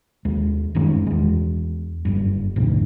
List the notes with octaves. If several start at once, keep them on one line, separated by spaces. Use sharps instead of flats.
D#2 G#3
G1 F#2 D#3 G#3
E2 G#3
F#1 G2
F1 D2 G#2 B2